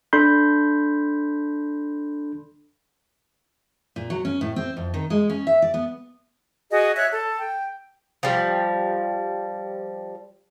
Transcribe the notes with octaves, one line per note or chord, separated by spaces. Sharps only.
D4 A4 B5 C6 G6
A#2
F#3
C#4
A2
C4
F2
D#3
G#3
C#4
E5
D5
B3
F#4 G#4 D#5
C#5 E5 F#6
A4
G5
F3 G3